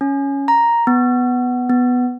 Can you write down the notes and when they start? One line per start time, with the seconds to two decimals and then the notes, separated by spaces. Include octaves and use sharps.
0.01 C#4
0.48 A#5
0.87 B3
1.70 B3